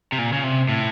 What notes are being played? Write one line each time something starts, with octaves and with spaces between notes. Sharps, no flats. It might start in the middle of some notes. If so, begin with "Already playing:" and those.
C3
A#2
C#3
C3
A2